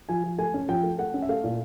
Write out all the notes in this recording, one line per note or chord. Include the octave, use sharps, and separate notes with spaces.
F3 G#5
F3
A3 G#5
C#4
F3 G5
A3
A3 F#5
C#4
E5
A3 F5
A#2